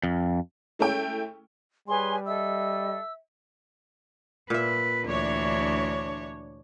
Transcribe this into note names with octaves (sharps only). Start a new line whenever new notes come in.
F2
G#3 A3 C#4 E4 G5
G3 G#4 B4 C#5 G#5 C6
A4 D#5 E5 E6
A#2 B4 E5
D2 E3 D4 C#5